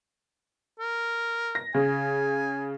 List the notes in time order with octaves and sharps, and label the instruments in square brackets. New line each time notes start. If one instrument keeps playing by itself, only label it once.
[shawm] A#4
[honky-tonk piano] A#6
[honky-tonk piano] C#3 [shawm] G#5